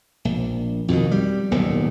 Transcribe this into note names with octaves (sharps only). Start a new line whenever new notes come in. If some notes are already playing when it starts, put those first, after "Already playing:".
A#1
F2 B2 D3 D#3
G3
D#1 B1 A2